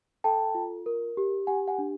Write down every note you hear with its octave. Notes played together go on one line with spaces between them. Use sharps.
A4 G5 A5
F4
A#4
G4
G4 F#5 G#5
F#5 G#5
D4